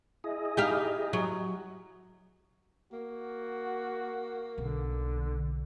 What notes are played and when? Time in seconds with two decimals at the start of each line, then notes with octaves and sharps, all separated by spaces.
0.24 E4 G#4 D#5
0.57 D#4 G4 F5
1.13 F#3
2.93 A#3 F#4
4.58 B1 D3